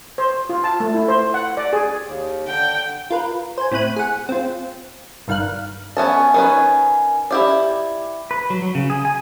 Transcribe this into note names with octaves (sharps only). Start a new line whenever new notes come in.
C5
F4
A5
A3
E4
C5
F#5
D5
G#4
D#2
D3 G5
F4 A#4 B4
C5 G#5
A2 C4 B5 F#6 D#7
G#4 F#5
C4 F4
G1 G2 D#3 F5 F#6
B3 C#4 A5
D#3 C#4 B4
E4 G4 D5
B4
F#3
F#3
C#3
G#4
G#5